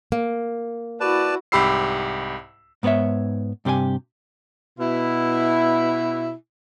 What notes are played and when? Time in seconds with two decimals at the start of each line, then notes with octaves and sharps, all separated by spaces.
0.12 A#3
1.00 E4 F#4 B4 D5 A5
1.52 C2 G#2 G4 B5 E6 C7
2.83 G#2 B3 B4 C#5 E5
3.65 G2 C3 G4 A#4 G#5
4.79 B2 E4